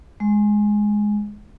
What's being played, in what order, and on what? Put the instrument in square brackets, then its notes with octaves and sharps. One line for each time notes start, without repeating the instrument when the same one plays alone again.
[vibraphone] G#3